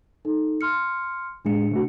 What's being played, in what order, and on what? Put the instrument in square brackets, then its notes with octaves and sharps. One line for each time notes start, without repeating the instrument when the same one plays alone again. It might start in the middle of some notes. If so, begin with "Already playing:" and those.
[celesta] D#4 A4
C6 F6 C#7
[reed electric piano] A2 G#3 [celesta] D4 C#7
[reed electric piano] C3 A3 F#4